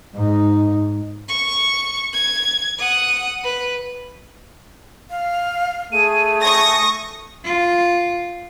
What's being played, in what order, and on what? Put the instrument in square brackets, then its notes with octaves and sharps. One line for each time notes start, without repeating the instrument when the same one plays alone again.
[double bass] G#2 D#4
[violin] C#6
G#6
F#5 D#6
B4
[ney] F5
[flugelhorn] A3 [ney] G#4 [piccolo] D#7
[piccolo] G#5 [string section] C#6 D#6 A#6
[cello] F4